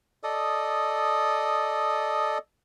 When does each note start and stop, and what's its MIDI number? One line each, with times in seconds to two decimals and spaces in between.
0.23 2.38 69
0.23 2.38 74
0.23 2.38 75
0.23 2.38 87